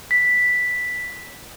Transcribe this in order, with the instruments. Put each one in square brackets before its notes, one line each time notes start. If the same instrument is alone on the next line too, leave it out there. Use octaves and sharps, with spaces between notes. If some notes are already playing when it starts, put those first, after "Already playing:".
[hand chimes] B6